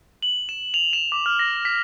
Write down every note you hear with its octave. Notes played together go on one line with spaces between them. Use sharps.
F#7
E7
F7
E7
D6
F6
A#6
B6